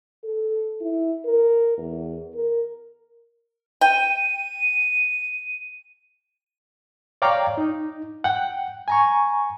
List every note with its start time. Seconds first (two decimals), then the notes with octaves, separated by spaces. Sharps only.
0.24 A4
0.81 E4
1.25 A#4
1.77 E2
2.34 A#4
3.81 G5 D#7
7.22 C#5 D5 F5 G5 A#5 D6
7.58 D#4
8.24 F#5 G5
8.88 G#5 A#5 C#6